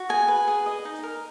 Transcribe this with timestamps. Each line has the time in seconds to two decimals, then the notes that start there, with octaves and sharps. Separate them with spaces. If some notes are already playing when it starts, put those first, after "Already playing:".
Already playing: F#4
0.09 G#4 G#5
0.28 B4
0.48 G#4
0.66 D#5
0.85 D#4
1.03 A#4